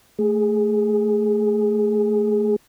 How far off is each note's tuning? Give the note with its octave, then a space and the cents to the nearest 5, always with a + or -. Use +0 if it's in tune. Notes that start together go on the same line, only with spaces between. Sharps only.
A3 +0 G#4 +0